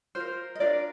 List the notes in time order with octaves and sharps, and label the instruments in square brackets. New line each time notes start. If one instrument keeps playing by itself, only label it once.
[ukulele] F4 A#4 C5
D#5
D4 F4 A#4 D5